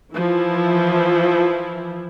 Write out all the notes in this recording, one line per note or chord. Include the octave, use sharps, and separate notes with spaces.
E3 F3 E4